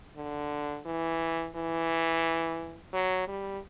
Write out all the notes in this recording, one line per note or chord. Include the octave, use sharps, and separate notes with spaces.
D3
E3
E3
F#3
G3